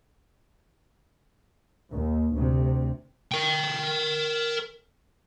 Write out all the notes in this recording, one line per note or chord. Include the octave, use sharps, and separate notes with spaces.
D#2
D2 C3
A#4 G5